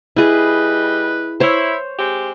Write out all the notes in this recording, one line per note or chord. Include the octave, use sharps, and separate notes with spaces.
G3 E4 G#4 B4 D#5
E4 C5 C#5
G#3 C4 G4